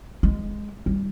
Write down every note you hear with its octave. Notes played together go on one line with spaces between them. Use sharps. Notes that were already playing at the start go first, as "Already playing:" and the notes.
G#3
G3